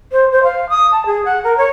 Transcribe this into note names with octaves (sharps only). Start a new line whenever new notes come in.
C5
C5
F5
D#6
A5
G#4
F#5
A#4
C#5